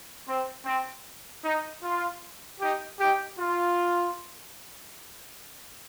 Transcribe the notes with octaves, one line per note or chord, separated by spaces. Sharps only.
C4
C4
D#4
F4
D#4 G4
D#4 G4
F4